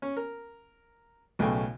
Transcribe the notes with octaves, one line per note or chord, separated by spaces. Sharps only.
C#4
A#4
B1 A2 C#3 A3 G5 G#5